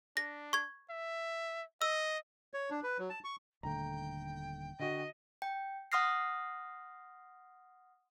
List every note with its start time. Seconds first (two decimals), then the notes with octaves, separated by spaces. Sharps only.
0.17 D4 A#6
0.53 C#6 G#6
0.90 E5
1.82 D#5 E6
2.54 C#5
2.70 D4
2.83 B4
2.99 F#3
3.10 A5
3.24 C#6
3.63 D#1 D3 A3 G5 A#5
4.79 D3 F#4 D#5
5.42 G5
5.92 F#5 C6 D#6 F6 A#6 C7